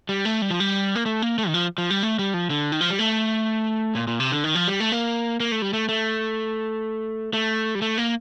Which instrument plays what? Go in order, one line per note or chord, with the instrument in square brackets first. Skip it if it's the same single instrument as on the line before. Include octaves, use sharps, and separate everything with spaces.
[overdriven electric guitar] G3
A3
G3
F3
G3
A#3
A3
A#3
A3
D#3
F3
F3
G3
A3
G3
F3
D3
D#3
F3
G3
A3
A#2
A#2
C3
D3
D#3
F3
G3
A3
A#3
A#3
A3
G3
A3
A3
A3
G3
A3
A#3